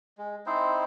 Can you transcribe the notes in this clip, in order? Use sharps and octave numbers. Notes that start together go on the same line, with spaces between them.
G#3
C4 D#4 E4 C5